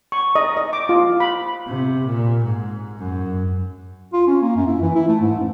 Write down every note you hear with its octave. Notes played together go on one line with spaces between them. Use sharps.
C#6
D#5
D#5
D6
F4
B5
C3
A#2
G#2
F#2
F4
C#4
A#3
F#2
E4
E3
E4
A3
G#2
F#2